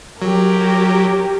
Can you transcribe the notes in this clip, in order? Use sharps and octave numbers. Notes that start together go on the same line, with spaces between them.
F#3 G4 A#4